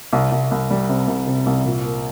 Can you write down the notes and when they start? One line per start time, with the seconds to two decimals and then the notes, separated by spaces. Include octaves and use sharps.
0.13 C2
0.32 C2
0.51 C2
0.71 G3
0.89 C3
1.08 C2
1.27 C3
1.46 C2
1.65 A#2
1.84 A#3